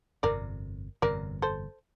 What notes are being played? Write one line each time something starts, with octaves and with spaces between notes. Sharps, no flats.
G1 F2 C3 A#4 D5
G1 F2 C3 A#4 D5
A4 C5